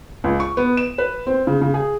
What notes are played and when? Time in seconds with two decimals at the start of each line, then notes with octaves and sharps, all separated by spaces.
0.24 C#2
0.40 C#6
0.57 B3
0.77 E7
0.98 B4
1.27 C4
1.47 C#3
1.61 C#3
1.74 G#4